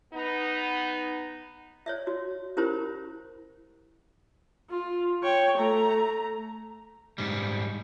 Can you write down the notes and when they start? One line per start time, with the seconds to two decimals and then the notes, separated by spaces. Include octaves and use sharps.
0.14 B3 D#4
1.86 C#5 D5 E5
2.07 F#4
2.57 C#4 E4 G4 A#4 C5 B5
4.70 F4
5.23 C#5 G5
5.58 A3 A#5
7.18 G#2 G3